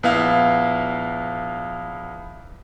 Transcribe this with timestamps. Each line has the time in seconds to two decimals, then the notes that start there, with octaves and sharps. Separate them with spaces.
0.03 A#1 B3 E4 F5